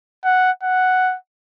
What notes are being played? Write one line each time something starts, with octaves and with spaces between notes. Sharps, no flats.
F#5
F#5